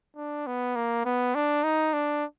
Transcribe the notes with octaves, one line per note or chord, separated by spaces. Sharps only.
D4
B3
A#3
B3
D4
D#4
D4